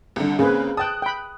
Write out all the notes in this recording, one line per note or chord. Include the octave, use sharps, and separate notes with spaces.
C2 D3
C#3 A#3 C4 G#4 B4
G5 A5 D#6 F#6
G5 B5